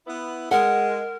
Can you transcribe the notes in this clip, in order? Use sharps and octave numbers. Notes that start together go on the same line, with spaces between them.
B3 E4
G#3 A#4 F#5